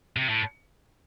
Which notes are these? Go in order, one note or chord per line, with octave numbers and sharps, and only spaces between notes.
C3
A2